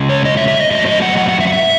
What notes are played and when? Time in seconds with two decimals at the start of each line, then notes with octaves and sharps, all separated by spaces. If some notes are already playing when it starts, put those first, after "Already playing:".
Already playing: C#3 G#3 C#4
0.09 C#5
0.25 D#5
0.37 E5
0.48 E5
0.60 D#5
0.71 A2 F#3 C4 D#5
0.86 D#5
1.02 F#5
1.18 F#5
1.29 F#5
1.40 E5
1.47 F#5
1.53 E5